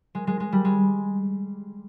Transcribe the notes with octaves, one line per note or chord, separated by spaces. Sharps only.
G#3
G#3
G#3
G3
G#3